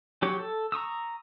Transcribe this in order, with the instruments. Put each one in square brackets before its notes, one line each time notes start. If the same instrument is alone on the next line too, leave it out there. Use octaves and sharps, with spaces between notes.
[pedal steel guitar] F#3 G4 C#5
A4
A#5 C#6 D#6 E6